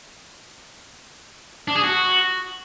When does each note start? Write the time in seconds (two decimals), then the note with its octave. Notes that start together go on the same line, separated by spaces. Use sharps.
1.68 D4
1.76 G#4
1.83 F#4